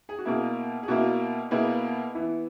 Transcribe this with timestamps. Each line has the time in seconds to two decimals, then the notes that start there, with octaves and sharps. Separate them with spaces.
0.09 G#4
0.19 F#4
0.25 B2 A#3 E4 G#4
0.83 G#4
0.88 B2 A#3 E4 F#4
1.51 B2 A#3 E4 G#4 B4
2.14 E3 B3 E4